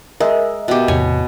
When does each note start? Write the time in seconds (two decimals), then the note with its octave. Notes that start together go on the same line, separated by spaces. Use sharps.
0.20 G#3 A#4 D#5 E5
0.68 B2 G4
0.88 E2 A2 C3 C#5 G#5